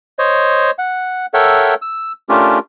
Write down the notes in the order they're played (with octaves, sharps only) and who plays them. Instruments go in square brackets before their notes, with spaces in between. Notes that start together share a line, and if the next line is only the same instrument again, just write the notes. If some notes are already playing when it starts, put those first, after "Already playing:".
[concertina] C5 C#5 D#5
F#5
A4 A#4 C#5 E5 F#5 G5
E6
A3 C#4 D4 F4 G4 A#4